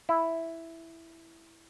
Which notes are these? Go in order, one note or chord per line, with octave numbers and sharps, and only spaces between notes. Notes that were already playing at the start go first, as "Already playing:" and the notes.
E4